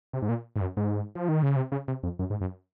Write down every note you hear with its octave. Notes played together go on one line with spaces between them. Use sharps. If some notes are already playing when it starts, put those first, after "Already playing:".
C3
G#2
A#2
G#2
F#2
G#2
F3
D#3
C#3
C3
C#3
C3
F2
F#2
G#2
F#2